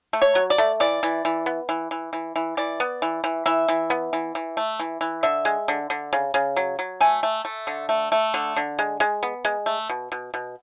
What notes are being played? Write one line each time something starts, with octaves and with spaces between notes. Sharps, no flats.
A3
C#5
F#3
D5
A3
E3 D5
E3
E3
B3
E3
E3
E3
E3
E3 D5
B3
E3
E3
E3 E5
E3
B3
E3
E3
A3
E3
E3
D3 E5
G#3
D3
D3
C#3
C#3
F#3
F#3
A3 G#5
A3
A3
D3
A3
A3
D3
D3
G#3
G#3
B3
G#3
A3
B2
B2
B2